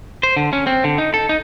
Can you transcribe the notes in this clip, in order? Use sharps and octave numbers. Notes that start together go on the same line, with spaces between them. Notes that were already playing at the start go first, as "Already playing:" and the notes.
C5
D3
C#4
C4
D3
D#4
A4
D#4